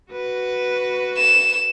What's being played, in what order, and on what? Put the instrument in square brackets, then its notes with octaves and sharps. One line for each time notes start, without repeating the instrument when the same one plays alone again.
[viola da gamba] F#4 B4
[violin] E7